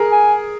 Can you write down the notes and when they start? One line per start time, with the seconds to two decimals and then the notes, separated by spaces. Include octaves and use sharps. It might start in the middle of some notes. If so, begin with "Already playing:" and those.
Already playing: G#4 A#4
0.12 G#5